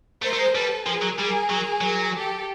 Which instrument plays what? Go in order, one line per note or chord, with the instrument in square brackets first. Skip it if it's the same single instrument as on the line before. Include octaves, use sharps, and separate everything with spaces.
[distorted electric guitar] A3 [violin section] A#4 C5
[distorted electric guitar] A3
G#3
[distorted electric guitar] G3 [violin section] A4 B4
[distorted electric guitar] F3 [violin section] G#4 A#4
[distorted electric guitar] F#3
[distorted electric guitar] G3 [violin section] G#4 A#4
[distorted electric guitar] F#3
F#3
[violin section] G4 A4